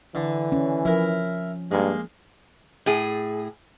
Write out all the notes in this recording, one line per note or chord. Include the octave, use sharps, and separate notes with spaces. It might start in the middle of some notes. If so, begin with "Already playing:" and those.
D3 E3
C#4
F3 E4 A#4
G2 G#3 A#3
A2 G#4